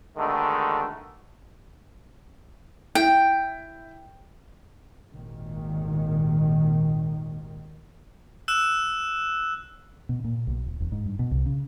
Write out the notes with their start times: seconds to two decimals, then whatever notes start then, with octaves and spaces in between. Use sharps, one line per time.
0.17 B2 D3 D#3 G#3 A3
2.95 E4 G5
5.12 G#1 D#2 A#2 D#3
8.48 E6 F#6 E7
10.09 B2
10.24 A#2
10.47 B1
10.66 D1
10.80 E1
10.92 G#2
11.06 G2
11.19 B2
11.31 C2
11.46 C#3